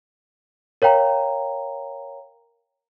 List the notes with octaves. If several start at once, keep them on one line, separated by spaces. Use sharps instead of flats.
A#4 C#5 F5 G5 A#5